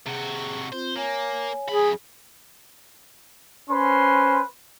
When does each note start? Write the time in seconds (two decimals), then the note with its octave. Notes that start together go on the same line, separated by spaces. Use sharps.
0.06 C3 F#4 G#4
0.72 C4 F4 C5
0.96 A#3 C#5 G#5
1.69 F#2 G#4 B5
3.70 C#4 B4 C5 C6